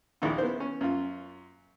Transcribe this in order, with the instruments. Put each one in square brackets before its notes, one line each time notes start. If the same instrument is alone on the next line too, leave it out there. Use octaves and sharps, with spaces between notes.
[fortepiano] A#1 D#2 D#4 E4
B3 E4 C5
C#4
F#2 F4